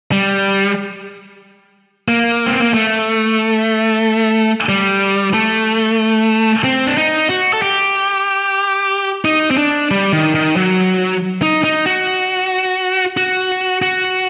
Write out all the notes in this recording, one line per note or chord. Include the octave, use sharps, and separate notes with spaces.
G3
A#3
C4
A#3
A3
G3
A3
C4
D4
D#4
F#4
A4
G4
D#4
C4
D4
G3
D#3
D#3
F#3
D#4
D#4
F#4
F#4
F#4